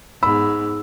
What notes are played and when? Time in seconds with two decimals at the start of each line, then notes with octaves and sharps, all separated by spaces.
0.23 G#2 B3 B5 E6